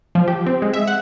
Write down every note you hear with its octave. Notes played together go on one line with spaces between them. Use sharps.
F3
G4
C4
G#3
E5
F#5